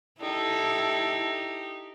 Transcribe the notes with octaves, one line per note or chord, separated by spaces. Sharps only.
D#4 E4 G4 A4